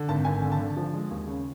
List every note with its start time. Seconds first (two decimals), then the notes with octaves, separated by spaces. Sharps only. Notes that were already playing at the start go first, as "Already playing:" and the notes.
Already playing: D3
0.08 G#1 A5
0.25 G#1 G#5
0.42 D3
0.52 A5
0.59 D3
0.77 F3
0.93 G#3
1.11 D#2
1.27 C#3